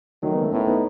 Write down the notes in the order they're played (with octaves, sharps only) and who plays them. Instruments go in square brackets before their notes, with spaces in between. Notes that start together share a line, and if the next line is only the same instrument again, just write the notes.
[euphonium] D#3 [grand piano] F#3 A3
[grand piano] G#3 B3
A3 C#4
[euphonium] A2 [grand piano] B3 D#4
[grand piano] B3 D#4